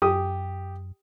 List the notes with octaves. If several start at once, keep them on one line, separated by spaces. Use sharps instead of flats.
F#2 G4 D#6